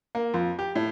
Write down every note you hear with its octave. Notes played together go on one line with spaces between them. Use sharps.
A#3
F2
G4
A2